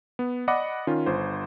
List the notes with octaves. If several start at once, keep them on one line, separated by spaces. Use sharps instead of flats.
B3
D5 D#5 F#5 B5 D6
D#3 C#4 F4
G1 C5